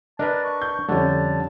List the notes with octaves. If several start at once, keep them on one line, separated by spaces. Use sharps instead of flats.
D4 A#4 B4 D#5 A5
C#6
G6
F2 D3 G3 C#4 A5